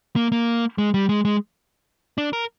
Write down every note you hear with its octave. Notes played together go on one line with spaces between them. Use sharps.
A#3
A#3
G#3
G3
G#3
G#3
D4
A#4